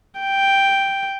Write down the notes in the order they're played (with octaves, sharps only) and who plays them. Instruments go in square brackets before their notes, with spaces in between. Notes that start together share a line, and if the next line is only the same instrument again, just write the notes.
[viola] G5